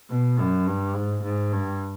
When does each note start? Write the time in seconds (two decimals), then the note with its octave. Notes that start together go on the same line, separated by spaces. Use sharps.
0.10 B2
0.39 F#2
0.67 G2
0.95 G#2
1.23 G#2
1.52 G2